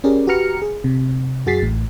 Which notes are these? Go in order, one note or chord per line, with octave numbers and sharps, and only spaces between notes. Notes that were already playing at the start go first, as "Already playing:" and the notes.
C#4 G4 G#4 A#4 D5
F#4 G4 B4 A#5 F6 C#7
G#4
C3
F#2 F#4 G#4 A6 B6 C7
A1 A2